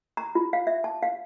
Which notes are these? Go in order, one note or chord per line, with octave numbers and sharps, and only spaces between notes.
A#5
F4
F5
E5
A5
F5